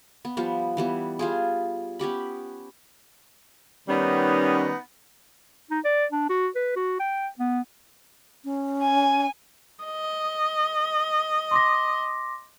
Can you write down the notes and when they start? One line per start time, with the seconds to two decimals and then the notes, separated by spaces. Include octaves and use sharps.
0.25 B3
0.37 F3 G3 B3
0.77 E3 G3 B3
1.19 G3 F4 G#4
1.99 B3 C#4 G4 B5
3.88 D#3 G3 B3 C#4 D#4
5.70 D#4
5.84 D5
6.12 D4
6.29 F#4
6.55 B4
6.76 F#4
7.00 G5
7.39 B3
8.45 C#4
8.83 G#5
9.85 D#5
11.51 C6 D6 A#6